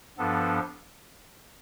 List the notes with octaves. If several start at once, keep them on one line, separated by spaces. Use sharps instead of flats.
G2 F3 B3 D4 A4